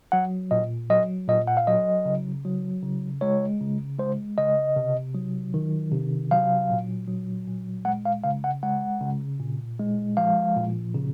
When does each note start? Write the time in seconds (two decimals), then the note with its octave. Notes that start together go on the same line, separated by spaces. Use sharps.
0.12 F#3 F#5
0.51 A#2 D#5
0.90 F#3 D#5
1.28 A#2 D#5
1.48 F#5
1.57 F5
1.67 F#3 D#5
2.05 C#3
2.45 F#3
2.83 C#3
3.21 G#3 C#5
3.61 C#3
3.99 G#3 C5
4.38 C#3 D#5
4.76 C3
5.15 F#3
5.54 D#3
5.92 C3
6.31 F#3 F5
6.70 A#2
7.08 F#3
7.47 A#2
7.85 G#3 F#5
8.05 F5
8.24 C#3 F5
8.44 F#5
8.63 G#3 F#5
9.01 C#3
9.40 A#2
9.79 G#3
10.17 F3 F5
10.57 A#2
10.95 C#3